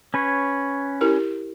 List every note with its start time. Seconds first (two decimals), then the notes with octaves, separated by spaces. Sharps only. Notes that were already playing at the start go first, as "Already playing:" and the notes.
0.14 C#4 B4 C#5
1.01 E4 G4 A#4